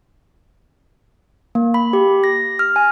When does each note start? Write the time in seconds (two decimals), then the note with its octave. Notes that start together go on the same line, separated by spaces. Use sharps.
1.55 A#3
1.74 B5
1.93 G4
2.24 A#6
2.59 F6
2.76 G#5